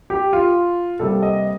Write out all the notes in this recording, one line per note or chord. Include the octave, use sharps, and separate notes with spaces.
G4
F4
C3 G3 A#3 A4
D#5